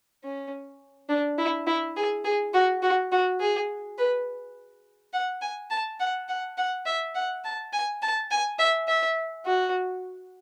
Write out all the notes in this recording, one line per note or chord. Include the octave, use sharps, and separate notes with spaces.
C#4
D4
E4
E4
G#4
G#4
F#4
F#4
F#4
G#4
B4
F#5
G#5
A5
F#5
F#5
F#5
E5
F#5
A5
G#5
A5
G#5
E5
E5
F#4